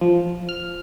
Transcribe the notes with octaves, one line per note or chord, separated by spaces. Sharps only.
F3
F6